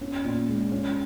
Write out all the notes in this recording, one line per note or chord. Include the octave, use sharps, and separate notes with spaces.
C#4
A#2
G#3
C#4